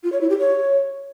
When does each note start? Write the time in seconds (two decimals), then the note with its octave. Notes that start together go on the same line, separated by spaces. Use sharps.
0.03 F4
0.12 C#5
0.20 E4
0.29 G4
0.38 C#5